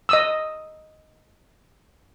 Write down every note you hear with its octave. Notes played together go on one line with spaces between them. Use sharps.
D#5 D#6 E6